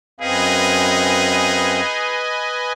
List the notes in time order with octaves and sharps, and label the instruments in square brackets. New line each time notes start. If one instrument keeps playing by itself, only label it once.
[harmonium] F#2 C4 F5 [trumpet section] D#4 G#4 [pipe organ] B4 D#5 G#5